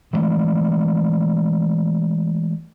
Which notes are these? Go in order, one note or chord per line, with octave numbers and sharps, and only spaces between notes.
E3 F3 G#3 A3